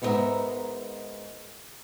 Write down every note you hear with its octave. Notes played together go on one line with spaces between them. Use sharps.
G#2 B3 E4 G4 A#4 E5